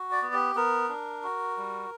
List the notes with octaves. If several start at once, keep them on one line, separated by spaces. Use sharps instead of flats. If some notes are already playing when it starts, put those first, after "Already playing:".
Already playing: F#4
D5
B3
G4
B3 A#4
D4
F#4
G3